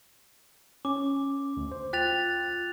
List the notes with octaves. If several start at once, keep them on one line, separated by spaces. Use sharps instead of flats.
C#4 D6
D2
C5
F4 G5 F#6 A6 B6 F7